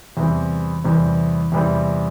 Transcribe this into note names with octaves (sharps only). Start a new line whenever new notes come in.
E2 C3 E3 G3 C4
E2 C3 E3 G3 C4
E2 C3 E3 G3 C4